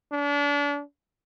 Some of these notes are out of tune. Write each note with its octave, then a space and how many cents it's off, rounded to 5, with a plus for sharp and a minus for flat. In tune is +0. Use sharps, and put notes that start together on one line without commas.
D4 -35